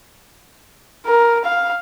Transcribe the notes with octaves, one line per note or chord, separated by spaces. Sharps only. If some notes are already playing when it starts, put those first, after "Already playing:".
A#4
F5